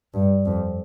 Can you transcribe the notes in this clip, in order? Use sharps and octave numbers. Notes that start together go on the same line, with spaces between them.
G2
F2